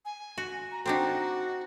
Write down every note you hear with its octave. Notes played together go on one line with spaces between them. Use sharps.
G#5
F#4
A#5
C4 D4 D#4 F#4